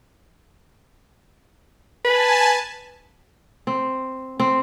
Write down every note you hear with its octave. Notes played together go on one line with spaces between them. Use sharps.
B4 G#5 A5
C4
C4